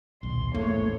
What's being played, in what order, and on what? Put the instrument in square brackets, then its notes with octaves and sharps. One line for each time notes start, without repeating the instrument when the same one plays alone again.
[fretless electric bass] D#1 B1 [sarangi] C6
[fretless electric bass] A1 E2 G#2 [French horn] A3 [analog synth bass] A#3 [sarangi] C#5